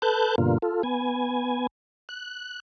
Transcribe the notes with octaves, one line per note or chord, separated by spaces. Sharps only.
A4 B4 A5 F#6 G6
G2 B2 D3 A#3 F4
F4 A4
B3 G#5
F#6